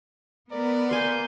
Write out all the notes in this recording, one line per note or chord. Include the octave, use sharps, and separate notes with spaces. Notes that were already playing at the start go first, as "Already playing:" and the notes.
B3 A#4 D5
A#3 G#5 C6 G6